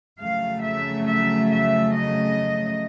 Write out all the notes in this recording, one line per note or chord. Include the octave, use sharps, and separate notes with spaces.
F2 C#3 F#3 A3 F5
E5
E5
E5
D#5